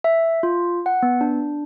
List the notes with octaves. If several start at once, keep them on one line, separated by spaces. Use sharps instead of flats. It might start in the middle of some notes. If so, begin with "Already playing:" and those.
E5
F4
F#5
B3
D4